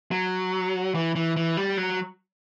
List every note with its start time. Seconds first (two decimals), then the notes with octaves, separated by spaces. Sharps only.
0.11 F#3
0.95 E3
1.16 E3
1.36 E3
1.57 G3
1.77 F#3